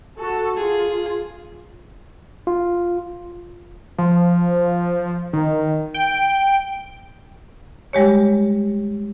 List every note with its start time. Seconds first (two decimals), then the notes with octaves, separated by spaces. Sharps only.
0.18 F#4 A4
0.56 F4 G#4
2.47 F4
3.98 F3
5.33 D#3
5.94 G5
7.93 G3 G#3 G4 C#5